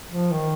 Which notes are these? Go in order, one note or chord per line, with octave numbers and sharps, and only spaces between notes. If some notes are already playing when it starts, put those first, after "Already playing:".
F3
D#3